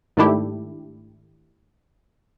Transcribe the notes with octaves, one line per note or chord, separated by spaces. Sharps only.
G#2 D#3 A3 D4 E4 G4